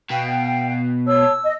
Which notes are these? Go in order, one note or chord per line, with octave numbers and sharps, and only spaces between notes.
B2 F5 G5
C#5 A5 E6
D#5